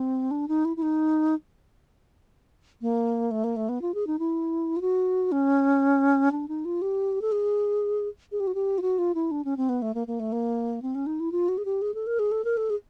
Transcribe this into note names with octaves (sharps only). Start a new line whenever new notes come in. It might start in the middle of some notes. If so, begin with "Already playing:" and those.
Already playing: C4
D4
D#4
E4
E4
D#4
A#3
A3
A#3
A3
B3
F4
G#4
D#4
E4
F4
F#4
C#4
D4
D#4
F4
G4
A4
G#4
G#4
G4
F#4
G4
F4
F#4
F4
E4
D4
C#4
C4
B3
A3
A#3
A#3
A3
A#3
C4
C#4
D#4
E4
F4
F#4
G#4
G4
G#4
A4
A#4
G#4
A4
A#4
A4
G#4